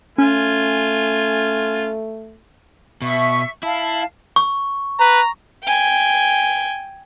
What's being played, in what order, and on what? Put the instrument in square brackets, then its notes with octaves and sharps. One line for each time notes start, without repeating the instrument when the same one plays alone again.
[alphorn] A3 [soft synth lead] C#4 [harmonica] F4 G#5
[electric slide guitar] B2 [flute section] E5 C#6
[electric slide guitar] E4 [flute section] F5 A5
[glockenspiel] C#6
[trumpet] B4 [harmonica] A#5
[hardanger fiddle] G5 G#5